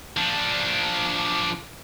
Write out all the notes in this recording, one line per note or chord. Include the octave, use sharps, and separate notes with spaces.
F3 D4